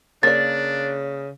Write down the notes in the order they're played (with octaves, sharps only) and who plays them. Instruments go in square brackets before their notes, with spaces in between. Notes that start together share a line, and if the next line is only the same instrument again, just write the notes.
[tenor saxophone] C#3 [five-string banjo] A#3 D5 [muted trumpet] D4 [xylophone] A6